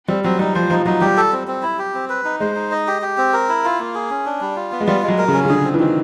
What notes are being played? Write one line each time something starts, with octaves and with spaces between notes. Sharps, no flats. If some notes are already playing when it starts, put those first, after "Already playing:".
G3 C4
F#3 C4
G3 D#4
F3 C5
F3 D#4
F#3 D#4
G3 G4
A4
C4
C4
E4
G4
C4
B4
D#4
G#3 C5
D#4
D#5
G4
G4
C4
A#4
E4
F4
A#3
G#4
C#4
D4
G3
F4
B3
G#3
G3 F4
G#3
F#3
A#4
C#3
C#4
C#3
D3 G#4
C4
E3
D#3 C4